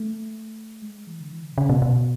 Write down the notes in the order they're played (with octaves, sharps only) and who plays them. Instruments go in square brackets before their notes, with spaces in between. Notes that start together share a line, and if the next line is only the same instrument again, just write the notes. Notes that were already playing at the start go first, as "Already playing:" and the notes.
Already playing: [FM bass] A3
G#3
E3
D3
E3
D3
B2
C#3
B2
B2